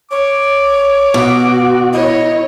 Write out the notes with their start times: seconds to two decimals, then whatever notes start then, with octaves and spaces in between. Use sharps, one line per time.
0.11 C#5 D6
1.14 B2 F#4
1.93 E4 C#5 D#5